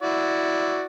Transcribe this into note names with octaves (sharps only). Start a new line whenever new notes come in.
E4 F#4 D5